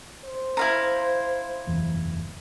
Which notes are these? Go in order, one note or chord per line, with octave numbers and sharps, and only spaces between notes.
C5
E4 F5 A#5
F#1 E2